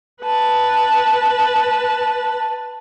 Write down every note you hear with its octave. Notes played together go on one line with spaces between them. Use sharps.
B4 A5